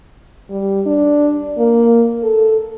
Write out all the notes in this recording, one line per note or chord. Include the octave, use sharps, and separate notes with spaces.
G3
D4
A#3
A4